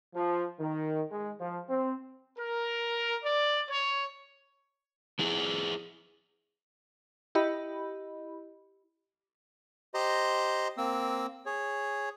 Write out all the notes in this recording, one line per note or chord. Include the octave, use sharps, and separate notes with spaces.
F3
D#3
G#3
F3
C4
A#4
D5
C#5
F3 E4 G#4
E4 G4 D#5 B5
G4 C5 D#5 A#5 C6
A#3 C4 E6
G#4 C#5